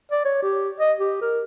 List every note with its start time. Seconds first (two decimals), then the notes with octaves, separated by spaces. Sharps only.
0.11 D5
0.25 C#5
0.43 G4
0.79 D#5
1.00 G4
1.21 A#4